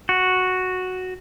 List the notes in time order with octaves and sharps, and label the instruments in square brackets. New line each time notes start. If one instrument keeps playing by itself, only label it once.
[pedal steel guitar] F#4